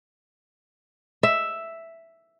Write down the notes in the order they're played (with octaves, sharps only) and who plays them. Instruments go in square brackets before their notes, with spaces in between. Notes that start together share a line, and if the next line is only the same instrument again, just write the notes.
[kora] E5